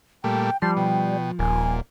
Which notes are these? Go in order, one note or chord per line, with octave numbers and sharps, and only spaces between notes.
A#2 G3 A3 G5
F3 G3 A5 C6
B2 G5
D#1 A#2 G#5